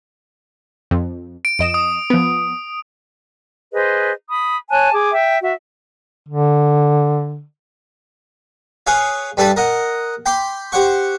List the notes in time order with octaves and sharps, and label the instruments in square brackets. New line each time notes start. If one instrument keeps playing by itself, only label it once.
[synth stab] F2
[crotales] D7
[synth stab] F2 D#5 E7 [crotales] D7
[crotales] D#6
[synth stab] F3 B3
[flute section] G#4 B4 C5 D#5
B5 D#6
C#5 G#5 A5 F#6
G#4 D6
E5 G5
F#4 E5
[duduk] D3
[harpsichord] G#4 B4 C#5 F5
G2 G3 A4 B4 A5 B5
A#4 D#5 F#5
G5 B5 C6 D6
G4 C5 F#5 C#6